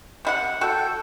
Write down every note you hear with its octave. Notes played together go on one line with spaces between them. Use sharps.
C3 E4 F#5
F#4 A4 G5